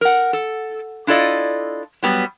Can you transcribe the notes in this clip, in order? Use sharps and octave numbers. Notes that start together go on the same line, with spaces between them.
A#4 F#5
A4
D4 E4 F4 A4 D5 D#5
F#3 G3 B3